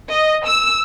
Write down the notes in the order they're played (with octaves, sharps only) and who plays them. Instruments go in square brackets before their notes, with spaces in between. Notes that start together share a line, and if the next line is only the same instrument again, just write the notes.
[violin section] D#5
E6